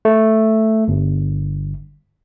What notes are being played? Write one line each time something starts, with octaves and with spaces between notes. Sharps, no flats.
A3
G1